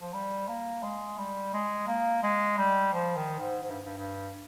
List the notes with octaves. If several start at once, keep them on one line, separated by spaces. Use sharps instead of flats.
F3
G3
A#3
G#3
G3
G#3
A#3
G#3
G3
F3
D#3
G#2
G#2
G2
G2
G2